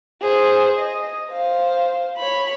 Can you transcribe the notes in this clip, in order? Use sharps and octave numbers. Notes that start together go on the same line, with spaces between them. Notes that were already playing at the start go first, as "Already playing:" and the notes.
G#4 C5
D#5
C5 F5
C#5 B5